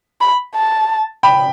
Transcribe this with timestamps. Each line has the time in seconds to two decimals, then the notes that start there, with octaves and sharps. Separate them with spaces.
0.21 B5
0.55 A5
1.23 G5 B5